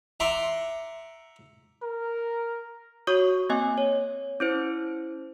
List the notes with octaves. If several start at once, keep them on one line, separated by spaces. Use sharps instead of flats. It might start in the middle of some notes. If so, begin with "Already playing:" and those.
E5 F#5 A#5 C6 D6
A#4
F#4 C#5 C#6 D#6
A#3 C4 D#5 G#5
C#5
C#4 E4 C5